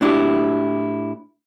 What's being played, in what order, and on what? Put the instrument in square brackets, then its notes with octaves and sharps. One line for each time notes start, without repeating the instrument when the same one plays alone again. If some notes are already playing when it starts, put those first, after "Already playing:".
[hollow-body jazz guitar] A2 D4 E4 F#4 G4